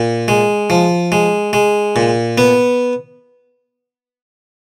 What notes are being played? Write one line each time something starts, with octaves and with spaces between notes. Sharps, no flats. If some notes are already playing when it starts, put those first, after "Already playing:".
Already playing: A#2
G#3
F3
G#3
G#3
A#2
B3